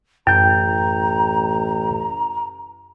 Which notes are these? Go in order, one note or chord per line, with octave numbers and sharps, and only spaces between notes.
A1 F#2 G5 A#5 G6